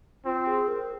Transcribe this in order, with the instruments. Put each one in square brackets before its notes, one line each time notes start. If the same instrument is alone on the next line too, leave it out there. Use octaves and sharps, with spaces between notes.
[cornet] C4 [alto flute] F4
[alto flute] G#4
A#4